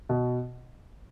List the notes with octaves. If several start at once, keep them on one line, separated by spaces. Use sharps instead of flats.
B2